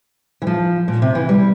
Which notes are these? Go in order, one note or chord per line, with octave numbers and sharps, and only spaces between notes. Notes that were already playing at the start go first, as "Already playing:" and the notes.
E3
F3
A#2
C3
E3
G3